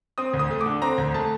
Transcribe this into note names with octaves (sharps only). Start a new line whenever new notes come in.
C4 D#6
D2
D#6
A3
D6
D3
C4 A#5
D2
A3 A5